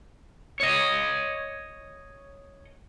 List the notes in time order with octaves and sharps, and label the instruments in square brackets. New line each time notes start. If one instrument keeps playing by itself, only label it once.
[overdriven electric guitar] C#5 D#5